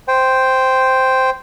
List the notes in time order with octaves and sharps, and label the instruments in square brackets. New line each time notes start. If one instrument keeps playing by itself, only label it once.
[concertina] C5 G5